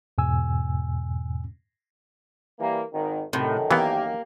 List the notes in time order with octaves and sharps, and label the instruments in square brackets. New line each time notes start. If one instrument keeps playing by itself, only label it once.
[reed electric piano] E2 G#2 B2 G#5 E6
[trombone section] E3 G3 A#3
G#1 D#3
[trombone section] F#2 D#3 [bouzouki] A2 [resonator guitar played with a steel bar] C3
[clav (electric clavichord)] E3 B3 [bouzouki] A#3 [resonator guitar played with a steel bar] G4